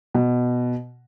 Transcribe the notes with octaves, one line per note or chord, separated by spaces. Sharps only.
B2